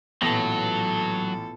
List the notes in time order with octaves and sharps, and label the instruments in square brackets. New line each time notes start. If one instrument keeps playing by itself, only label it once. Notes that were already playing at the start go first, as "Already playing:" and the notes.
[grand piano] A1 A#6 [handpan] A#2 B3 [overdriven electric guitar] F#3 [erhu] A4